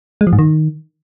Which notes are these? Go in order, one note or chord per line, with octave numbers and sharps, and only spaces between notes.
G#3
F3
G#2
D#3